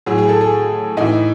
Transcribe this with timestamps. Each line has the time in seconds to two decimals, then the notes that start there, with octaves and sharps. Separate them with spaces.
0.06 A2 F#3 G#4
0.18 G#4
0.29 A4
0.41 G#4
0.97 A2 E3 D#4